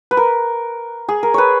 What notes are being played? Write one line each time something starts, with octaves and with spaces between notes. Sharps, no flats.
B4
A#4
G#4
A#4
B4 C#5